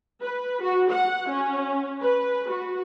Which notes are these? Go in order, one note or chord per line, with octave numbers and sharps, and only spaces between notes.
B4
F#4
F#5
C#4
B4
F#4